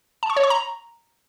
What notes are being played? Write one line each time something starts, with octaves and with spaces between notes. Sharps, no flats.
A5
C#6
C#5
C#6
A#5